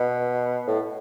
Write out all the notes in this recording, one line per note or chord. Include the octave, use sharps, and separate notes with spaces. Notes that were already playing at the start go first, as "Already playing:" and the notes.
Already playing: B2
A2